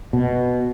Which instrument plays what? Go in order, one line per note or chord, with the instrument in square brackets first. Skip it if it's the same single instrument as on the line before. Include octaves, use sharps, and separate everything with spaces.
[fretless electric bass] B2